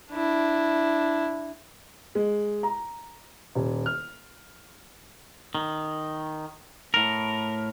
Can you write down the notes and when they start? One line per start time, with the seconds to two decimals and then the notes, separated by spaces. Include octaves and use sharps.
0.12 D4 E4
2.15 G#3
2.63 A#5
3.55 D#1
3.86 F6
5.55 D#3
6.94 A2 A#4